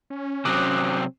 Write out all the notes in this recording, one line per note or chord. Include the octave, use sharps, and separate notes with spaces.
C#4
C3 F#3 C4 D6 D#6 F#6